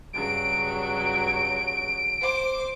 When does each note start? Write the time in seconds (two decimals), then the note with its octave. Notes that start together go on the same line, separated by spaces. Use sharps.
0.13 G2 C#3 F#3 D7
2.20 C5 D6